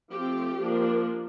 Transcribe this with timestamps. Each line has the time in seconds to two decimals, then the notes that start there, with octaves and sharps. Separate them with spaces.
0.12 F3 A3 C4 G4
0.60 F3 A#3 D4